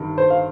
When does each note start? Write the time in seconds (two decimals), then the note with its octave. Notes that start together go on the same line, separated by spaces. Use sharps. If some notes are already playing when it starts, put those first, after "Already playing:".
Already playing: G1 G2 D#3 G3
0.18 C5
0.30 F5